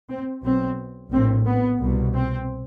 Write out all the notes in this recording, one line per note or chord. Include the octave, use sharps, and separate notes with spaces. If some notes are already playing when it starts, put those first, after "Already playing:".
C4
B1 B2 C4
A#1 A2 C4
B3
C2 B2
C4